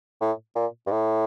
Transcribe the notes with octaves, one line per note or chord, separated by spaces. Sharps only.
A2
A#2
G2
A2